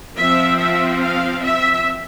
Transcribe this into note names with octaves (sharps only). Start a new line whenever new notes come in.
F3 C4 E5
E5
F5
E5